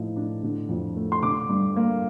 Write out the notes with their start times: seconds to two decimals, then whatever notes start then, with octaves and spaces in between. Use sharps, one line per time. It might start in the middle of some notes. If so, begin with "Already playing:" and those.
Already playing: A2 F3 D#4
0.16 D4
0.43 D3
0.69 F2
0.97 A3
1.12 C6
1.23 D3 D6
1.49 G2
1.76 A#3